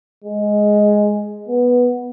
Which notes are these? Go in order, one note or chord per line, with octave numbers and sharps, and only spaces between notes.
G#3
B3